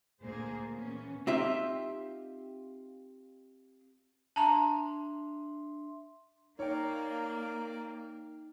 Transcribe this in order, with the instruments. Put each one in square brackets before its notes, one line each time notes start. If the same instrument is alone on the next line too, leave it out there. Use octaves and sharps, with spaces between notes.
[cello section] D2 A#2 A#3 G#4 C5
A#2 E3 B3 C#4
[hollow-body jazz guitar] C4 D#4 F4 G4 E5
[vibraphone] D4 E5 C6 [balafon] A5 A#5
[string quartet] A#3 [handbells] D#4 G5 [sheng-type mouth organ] A#4 D5 [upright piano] C#5